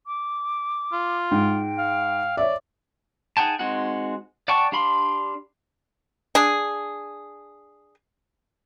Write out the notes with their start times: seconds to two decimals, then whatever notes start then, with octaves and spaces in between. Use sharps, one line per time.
0.07 D6
0.93 F4
1.31 G#2 G5
1.78 F5
2.37 C#5 D5 E5
3.37 D#4 G#4 F#5 G5 A5
3.59 G#3 C4 D#4 F#4 F#5
4.48 D5 F#5 G5 A5 C#6
4.72 D4 G4 F5 B5 C6
6.35 D4 G#4